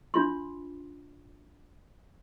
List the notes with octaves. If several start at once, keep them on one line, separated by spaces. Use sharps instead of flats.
D4 F4 C6